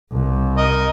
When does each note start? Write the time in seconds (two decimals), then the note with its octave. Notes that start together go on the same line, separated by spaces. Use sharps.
0.11 C2
0.58 A#4 D#5